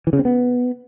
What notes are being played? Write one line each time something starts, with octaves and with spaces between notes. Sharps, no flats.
E3
C#3
C4
B3